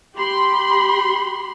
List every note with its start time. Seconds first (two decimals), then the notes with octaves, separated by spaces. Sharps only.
0.15 G4 B5 C6